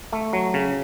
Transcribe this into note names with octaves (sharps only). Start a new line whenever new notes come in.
A3
F#3
C#3